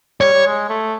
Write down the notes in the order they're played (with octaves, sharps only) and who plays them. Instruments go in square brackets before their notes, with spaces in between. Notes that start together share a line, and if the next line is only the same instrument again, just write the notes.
[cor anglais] G3 [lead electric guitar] C#5
[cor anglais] G3
G#3
A3